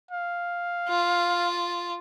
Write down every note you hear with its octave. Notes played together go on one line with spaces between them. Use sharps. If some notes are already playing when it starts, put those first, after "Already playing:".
F5
F4